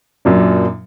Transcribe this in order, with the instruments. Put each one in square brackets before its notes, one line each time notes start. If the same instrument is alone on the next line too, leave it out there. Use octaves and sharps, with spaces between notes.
[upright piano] F#2 A#2 D4